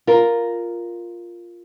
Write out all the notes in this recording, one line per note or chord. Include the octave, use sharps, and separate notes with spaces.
F4 A#4